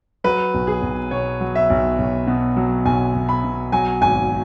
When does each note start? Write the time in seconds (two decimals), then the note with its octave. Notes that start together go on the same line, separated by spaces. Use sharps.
0.24 F#3 B4
0.54 B1
0.67 G#4
0.82 B1
1.11 B2 C#5
1.41 F#3
1.55 E5
1.70 B1
1.98 B1
2.27 B2
2.57 F#3
2.85 B1 G#5
3.14 B1
3.29 B5
3.44 B2
3.72 F#3 G#5
4.01 G#1 G#5